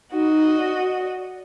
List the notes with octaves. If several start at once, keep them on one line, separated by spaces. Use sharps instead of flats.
D#4 F#4 D#5
D5